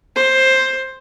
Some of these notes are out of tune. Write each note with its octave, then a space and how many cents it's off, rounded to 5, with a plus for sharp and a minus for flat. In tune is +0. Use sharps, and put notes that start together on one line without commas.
C5 +10